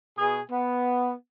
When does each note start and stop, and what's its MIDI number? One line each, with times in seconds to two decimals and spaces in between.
0.17 0.39 47
0.17 0.39 68
0.51 1.12 59